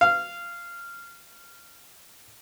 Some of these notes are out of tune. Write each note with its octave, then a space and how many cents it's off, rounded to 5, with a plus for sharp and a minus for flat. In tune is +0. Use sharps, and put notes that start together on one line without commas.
F5 -15